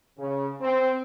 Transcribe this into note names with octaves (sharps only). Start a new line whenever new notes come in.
C#3
C4